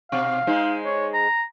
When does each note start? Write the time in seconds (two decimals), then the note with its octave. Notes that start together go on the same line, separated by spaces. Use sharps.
0.12 B2 C4 F5
0.47 G#3 D#4 C5
0.85 C#5
1.14 A#5